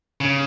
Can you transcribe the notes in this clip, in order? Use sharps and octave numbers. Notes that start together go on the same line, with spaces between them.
C#3